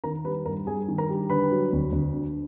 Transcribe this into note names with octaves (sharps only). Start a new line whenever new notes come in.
D#3 A#4 A#5
G3 B4 B5
G2 A#4 A#5
G2 G#4 G#5
D#3
A#4 A#5
G3
D3 B4 B5
F#3
D2
D2
D3